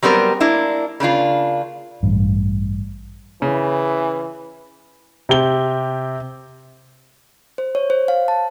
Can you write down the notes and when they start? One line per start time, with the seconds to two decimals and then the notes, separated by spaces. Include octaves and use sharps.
0.03 F#3 G3 B3 C4 A#4
0.41 A#3 D4 E4
1.00 C#3 A#3 D4 F4
2.03 A1 G2
3.42 C#3 E3
5.29 C3 G4 G7
7.58 C5
7.75 C#5
7.90 C5
8.08 F5
8.28 A5